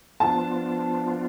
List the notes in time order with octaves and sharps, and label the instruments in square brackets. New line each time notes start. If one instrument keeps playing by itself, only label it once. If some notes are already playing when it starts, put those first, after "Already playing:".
[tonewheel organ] F3 B3 D4 F4 [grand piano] A5